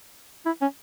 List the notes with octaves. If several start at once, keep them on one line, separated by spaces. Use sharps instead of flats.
E4
C#4